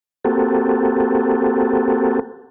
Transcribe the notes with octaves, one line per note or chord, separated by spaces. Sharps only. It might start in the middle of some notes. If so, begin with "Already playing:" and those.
A#3 C4 F#4 G4 A4